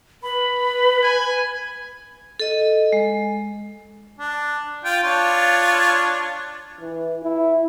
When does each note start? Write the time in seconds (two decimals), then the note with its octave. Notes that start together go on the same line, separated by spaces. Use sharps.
0.23 B4 B5
1.03 G#5
2.40 A4 D#5
2.93 G#3
4.19 D4
4.85 F4 G5
5.04 D4 F4 C#5
6.81 E3
7.23 E4